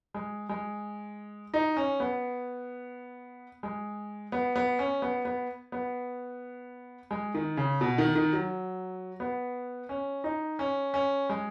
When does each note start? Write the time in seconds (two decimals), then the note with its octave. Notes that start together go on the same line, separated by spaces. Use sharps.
0.14 G#3
0.49 G#3
1.54 D#4
1.77 C#4
2.00 B3
3.63 G#3
4.32 B3
4.56 B3
4.79 C#4
5.02 B3
5.25 B3
5.72 B3
7.11 G#3
7.34 D#3
7.57 C#3
7.81 B2
7.98 D#3
8.15 D#3
8.33 F#3
9.20 B3
9.89 C#4
10.24 D#4
10.59 C#4
10.94 C#4
11.29 G#3